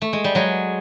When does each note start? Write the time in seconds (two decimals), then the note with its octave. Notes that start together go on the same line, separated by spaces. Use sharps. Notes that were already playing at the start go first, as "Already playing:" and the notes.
0.02 A3
0.13 G#3
0.24 G3
0.35 F#3 G#3